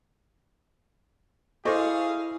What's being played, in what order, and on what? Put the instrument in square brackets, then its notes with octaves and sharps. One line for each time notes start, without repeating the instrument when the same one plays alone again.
[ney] E4 [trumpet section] G#4 F5 [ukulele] A4 D#5 [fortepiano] C5 C#6 D6